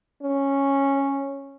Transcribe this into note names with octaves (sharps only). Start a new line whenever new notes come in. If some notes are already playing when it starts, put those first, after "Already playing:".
C#4